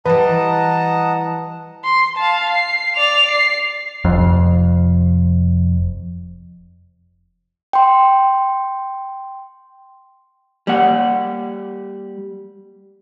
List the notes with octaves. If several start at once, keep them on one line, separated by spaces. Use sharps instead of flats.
E3 G3 B4 D#5 F#5 A5 A#5
C6
F5 A5
C7
D5 F7
C7
F1 F2
G5 C6
G3 A#3 F#5